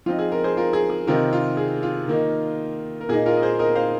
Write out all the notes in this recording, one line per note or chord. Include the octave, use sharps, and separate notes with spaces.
F3 C4 D#4 F4
G#4
F4 A#4
G#4 C5
F4 A#4
G#4
G#4
C3 D#3 C4 D#4 F4 A#4
F4
G#4
F4
D#3 A#3 D#4
A#4
A#2 A#3 D#4 G#4
F4 A#4
D#5
G#4 C5
A#4 D#5
C5 F5